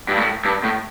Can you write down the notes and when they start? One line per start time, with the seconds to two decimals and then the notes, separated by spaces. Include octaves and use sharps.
0.08 G2
0.17 A2
0.45 G2
0.63 A2